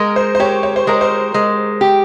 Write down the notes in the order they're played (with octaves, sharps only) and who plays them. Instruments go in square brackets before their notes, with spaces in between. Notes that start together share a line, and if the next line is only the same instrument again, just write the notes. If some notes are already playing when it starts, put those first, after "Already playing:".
Already playing: [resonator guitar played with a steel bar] G#3 [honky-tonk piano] A#4
[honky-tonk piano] C5
C5
[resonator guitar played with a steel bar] G4 [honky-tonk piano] C#5
[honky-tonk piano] C#5
C5
[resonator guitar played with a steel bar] G#3 [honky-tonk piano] A#4
[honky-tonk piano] C5
[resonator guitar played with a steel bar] G#3
G4